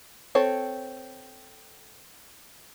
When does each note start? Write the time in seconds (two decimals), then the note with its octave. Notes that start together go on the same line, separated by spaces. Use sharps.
0.35 C4 A4 C#5